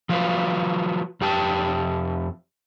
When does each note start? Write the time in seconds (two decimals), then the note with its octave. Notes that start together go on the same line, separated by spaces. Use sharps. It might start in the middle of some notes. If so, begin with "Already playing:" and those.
0.09 F3 F#3 F4 F#4 A#4 B4
1.21 F2 G4 G5 A5